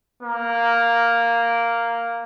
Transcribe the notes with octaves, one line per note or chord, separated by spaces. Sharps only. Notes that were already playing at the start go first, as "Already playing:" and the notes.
A#3